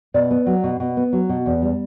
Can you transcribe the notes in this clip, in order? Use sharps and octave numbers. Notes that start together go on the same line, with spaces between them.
B2 D5
B3
F#3
B2
B2
B3
F#3
B2
E2
G3